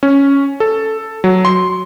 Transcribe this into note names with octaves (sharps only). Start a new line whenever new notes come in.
C#4
A4
F#3
C6